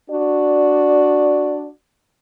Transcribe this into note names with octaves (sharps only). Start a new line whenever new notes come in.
D4 F#4 D5